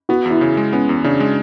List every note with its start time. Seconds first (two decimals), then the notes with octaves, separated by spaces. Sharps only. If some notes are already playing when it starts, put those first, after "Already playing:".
0.09 B3 F#4
0.25 E2 E4
0.41 C#3
0.57 G#3
0.73 B3 C#4
0.89 E2
1.04 C#3 D4
1.20 G#3